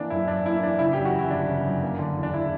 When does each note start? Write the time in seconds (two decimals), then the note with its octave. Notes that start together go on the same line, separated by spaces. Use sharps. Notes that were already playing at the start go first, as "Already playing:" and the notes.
Already playing: E3 A#3 D4
0.10 F#2 E4
0.28 F#2 D4
0.46 A#3 E4
0.62 E3 D4
0.79 C#3 E4
0.93 G4
0.97 F#2
1.05 F#4
1.14 E3 E4
1.30 G1 D4
1.48 C#3
1.65 F#2
1.82 A#3
1.99 D3
2.17 E2
2.23 D4
2.34 E4